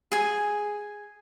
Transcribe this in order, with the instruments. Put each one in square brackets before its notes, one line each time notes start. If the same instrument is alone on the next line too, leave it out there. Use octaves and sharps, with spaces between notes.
[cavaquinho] G#4 G#5